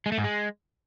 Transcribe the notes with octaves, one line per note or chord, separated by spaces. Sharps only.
G#3
A3
G#2
G#3